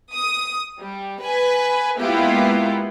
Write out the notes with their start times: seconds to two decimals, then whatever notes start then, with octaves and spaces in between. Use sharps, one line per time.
0.14 D#6
0.80 G3
1.22 B4 G#5
2.00 G#3 A#3 B3 E4 F4 G4